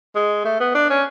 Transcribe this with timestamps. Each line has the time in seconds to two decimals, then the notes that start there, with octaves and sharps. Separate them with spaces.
0.15 G#3
0.45 A3
0.60 B3
0.75 D4
0.90 C#4